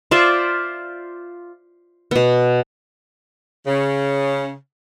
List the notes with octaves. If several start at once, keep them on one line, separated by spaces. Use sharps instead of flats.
F4 C5 D5 E5
B2 B3
C#3